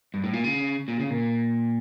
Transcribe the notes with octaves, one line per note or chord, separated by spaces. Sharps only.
G2
A2
A#2
C#3
A#2
C#3
A#2